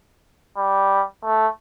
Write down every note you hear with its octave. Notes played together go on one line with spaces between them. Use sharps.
G3
A3